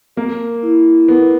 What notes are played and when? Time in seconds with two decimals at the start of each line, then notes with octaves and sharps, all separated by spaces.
0.17 A#3 A#4
0.63 E4
1.08 B3 A#4